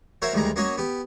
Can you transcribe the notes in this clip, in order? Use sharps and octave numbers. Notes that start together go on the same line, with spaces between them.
F#4 A#4 C5 C#5 E5
D2 D#3 G3 G#3 A#5
A#3 C#4 F#4 C#5 D#5 G#5
B3 G4